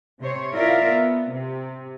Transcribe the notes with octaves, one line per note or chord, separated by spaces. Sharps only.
C3 C5 C#5
E4 F4 A#4 D5 E5 F5
B3
C3